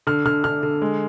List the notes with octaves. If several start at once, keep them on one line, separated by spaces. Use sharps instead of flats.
D3 F6
D3 F6
D3 F6
D3
G#3